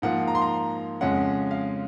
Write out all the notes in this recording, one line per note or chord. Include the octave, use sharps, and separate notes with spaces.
G#2 F3 A#3 F#5
A#5
C6
A#5
F2 C#3 G#3 C#4 F#5
F5